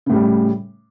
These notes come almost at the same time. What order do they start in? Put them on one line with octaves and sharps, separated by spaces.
C#3 A2 G3